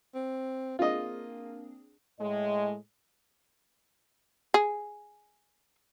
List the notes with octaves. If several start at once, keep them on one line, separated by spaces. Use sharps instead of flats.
C4
A#3 C4 D4 F4 G#4 D#5
A2 G#3 D#5
G#4